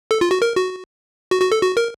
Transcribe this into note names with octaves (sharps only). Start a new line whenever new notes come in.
A4
F4
F#4
A#4
F#4
F#4
F#4
A4
F#4
A#4